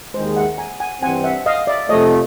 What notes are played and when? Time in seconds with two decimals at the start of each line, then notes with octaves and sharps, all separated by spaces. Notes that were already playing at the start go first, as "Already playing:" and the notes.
0.14 D#2 D#3 G#3 C5
0.36 E5 F#5
0.58 G#5 A#5
0.80 F#5 G#5
1.02 G2 E3 G3 C4 F#5 G#5
1.24 E5 F#5
1.46 D#5 F5
1.67 D5 E5
1.89 F2 C3 F3 A3 C#5 D#5